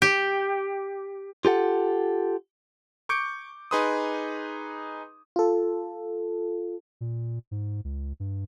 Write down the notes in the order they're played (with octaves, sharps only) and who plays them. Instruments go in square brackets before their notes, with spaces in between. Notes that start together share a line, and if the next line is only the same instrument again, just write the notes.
[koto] G4
[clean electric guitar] F4 G4 A4 F#5
[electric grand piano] C#6 D6 G6 C#7 D7
D#4 G#4 B4 C6 D#6
[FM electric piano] F4 A4
[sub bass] A#2
G#2
C#2
G2